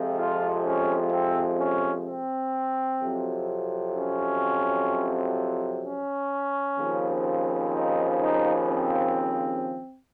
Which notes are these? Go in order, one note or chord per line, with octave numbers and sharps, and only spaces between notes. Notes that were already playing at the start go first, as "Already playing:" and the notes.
Already playing: F2 C3 F3 G#3 C4
F4
C#4
C4
C#4
C4
F2 C3 F#3
C#4
C#4
D#2 C#3 F3 C4
D#4
D#4
C4